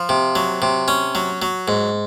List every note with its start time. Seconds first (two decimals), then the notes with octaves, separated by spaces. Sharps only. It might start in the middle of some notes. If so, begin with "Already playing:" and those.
Already playing: F3
0.09 C3
0.35 F#3
0.62 C3
0.88 C#4
1.15 F#3
1.42 F#3
1.68 G#2